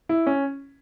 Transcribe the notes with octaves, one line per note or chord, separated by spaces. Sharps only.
E4
C#4